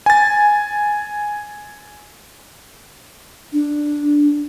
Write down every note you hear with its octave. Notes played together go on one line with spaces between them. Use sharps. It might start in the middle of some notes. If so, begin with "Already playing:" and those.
G#5 A6
D4